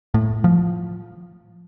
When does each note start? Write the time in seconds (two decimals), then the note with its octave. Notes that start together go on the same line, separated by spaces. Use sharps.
0.14 A2
0.44 F3